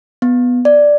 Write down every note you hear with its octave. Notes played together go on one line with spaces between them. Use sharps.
B3
D5